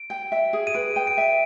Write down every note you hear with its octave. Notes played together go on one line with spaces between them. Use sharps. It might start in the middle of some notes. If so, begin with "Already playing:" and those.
Already playing: D7
G5
E5
G#4
D#7
B4 D7
G5
D7
E5